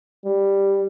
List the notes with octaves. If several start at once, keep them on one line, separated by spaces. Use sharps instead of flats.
G3